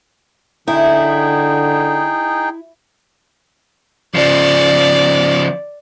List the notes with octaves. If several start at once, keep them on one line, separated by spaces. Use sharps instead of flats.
D3 D#4 E4 G#4 G5
C#3 F3 D5